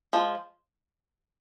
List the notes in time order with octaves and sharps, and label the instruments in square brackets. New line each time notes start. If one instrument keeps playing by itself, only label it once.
[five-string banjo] F3 G#3